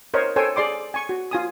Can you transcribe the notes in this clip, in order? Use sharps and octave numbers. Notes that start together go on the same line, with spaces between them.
A#4 C5 C#5 D#5
A4 C5 C#5 G5 G#5
G#4 D5 C6 D6
G#5 C#6
F#4
F4 G#5 D#6